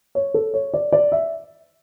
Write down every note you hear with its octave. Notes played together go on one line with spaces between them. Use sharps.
C#5
A4
C#5
D5
D5
E5